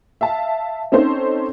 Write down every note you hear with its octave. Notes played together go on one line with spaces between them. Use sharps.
E5 F5 A5
C4 C#4 D#4 A4 C5 C#5